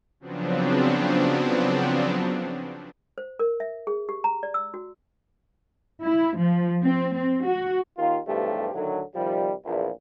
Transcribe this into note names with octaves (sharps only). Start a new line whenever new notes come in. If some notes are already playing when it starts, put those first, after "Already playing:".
C#3 F3 F#3 B3 C4 D4
C5
A#4
E5
G#4
G4
A#5
D5
E6
F#4
E4
F3
C4
C4
F#4
D#2 D#3 F4
B1 E2 G2 F3 A3 G4
A2 D3 D#3 F#3
C3 D#3 F3 G3
A#1 E2 A#2